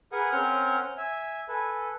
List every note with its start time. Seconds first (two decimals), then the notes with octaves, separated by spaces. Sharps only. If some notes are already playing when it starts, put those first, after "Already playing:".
0.12 G#4 A#4 B4 F#5 G#5
0.32 C4 C#4 A#4 F#5 F6 G6
0.97 E5 G#5
1.48 A4 B4 G#5